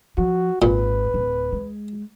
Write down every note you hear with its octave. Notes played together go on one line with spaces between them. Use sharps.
F3 F#4
G#1 A#2 B4
D1
G#3